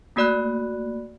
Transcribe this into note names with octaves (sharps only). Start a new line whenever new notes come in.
A3 A#3 F#4 D5 B5 F#6